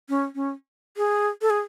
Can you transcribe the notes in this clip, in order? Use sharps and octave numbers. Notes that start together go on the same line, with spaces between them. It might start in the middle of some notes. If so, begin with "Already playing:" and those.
C#4
C#4
G#4
A4
G#4